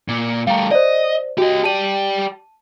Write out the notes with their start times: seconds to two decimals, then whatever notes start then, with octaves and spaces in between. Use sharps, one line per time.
0.08 A#2
0.47 G3 A3 F5 A#5
0.71 C5 D5 D#5
1.38 F#4 G4 D#5
1.64 G4 D5 A5 D#7